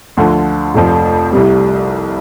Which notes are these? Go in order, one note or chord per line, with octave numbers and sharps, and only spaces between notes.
D2 D3 F3
F1 F2 F3
C2 C3 G3